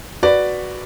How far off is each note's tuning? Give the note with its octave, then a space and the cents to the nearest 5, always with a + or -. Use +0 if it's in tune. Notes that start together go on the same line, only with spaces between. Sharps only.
F#4 +0 B4 +0 D5 +0